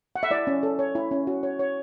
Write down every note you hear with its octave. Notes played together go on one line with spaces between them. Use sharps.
F#5
E5
E4 D5
C#4
A4
C#5
E4
C#4
F#4
C#5
C#5